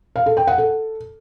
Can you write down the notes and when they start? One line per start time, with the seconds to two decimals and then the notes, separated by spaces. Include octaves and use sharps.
0.16 F5
0.26 A4
0.37 G5
0.47 F#5
0.58 A4